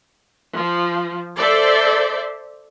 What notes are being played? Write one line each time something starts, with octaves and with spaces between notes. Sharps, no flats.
F3
A4 C5 D5 E5